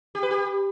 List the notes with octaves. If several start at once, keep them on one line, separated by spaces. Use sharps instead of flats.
G4
B4
G4